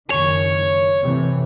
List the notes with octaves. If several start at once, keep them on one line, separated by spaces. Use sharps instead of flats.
F#1 D#3 C#5
C3 E3 A3